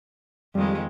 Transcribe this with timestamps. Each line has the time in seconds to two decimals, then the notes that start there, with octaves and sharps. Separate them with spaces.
0.55 F2 D#3 G3 G#3